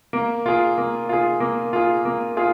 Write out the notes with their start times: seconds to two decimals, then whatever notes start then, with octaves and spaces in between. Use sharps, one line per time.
0.13 A#3
0.46 F4 G#4
0.78 A#3
1.09 F4 G#4
1.40 A#3
1.73 F4 G#4
2.05 A#3
2.37 F4 G#4